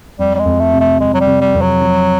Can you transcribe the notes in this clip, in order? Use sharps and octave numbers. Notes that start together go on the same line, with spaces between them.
F2 G3
G3
G#3
F2
A3
C3
A3
F2 G#3
F#3
G3
C3
G3
F2
F#3
F3